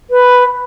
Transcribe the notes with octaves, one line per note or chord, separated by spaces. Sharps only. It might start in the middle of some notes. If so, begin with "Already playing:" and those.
B4